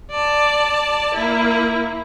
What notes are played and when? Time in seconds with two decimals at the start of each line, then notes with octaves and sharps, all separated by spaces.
0.11 D5 A5
1.15 A#3 E4